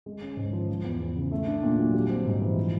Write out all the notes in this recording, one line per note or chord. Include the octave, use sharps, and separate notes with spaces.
G#3
C#4
G#2
F3
F3
E2
E2
C#3
A3
D4
A#2
F#3
G3
C4
G#2
E3
F3